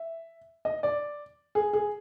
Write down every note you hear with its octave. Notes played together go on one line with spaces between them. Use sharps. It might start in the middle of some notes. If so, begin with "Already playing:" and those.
Already playing: E5
D#5
D5
G#4
G#4